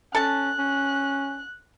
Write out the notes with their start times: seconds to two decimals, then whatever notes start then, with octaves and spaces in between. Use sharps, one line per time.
0.15 C#4 A4 A5 F#6
0.58 C#4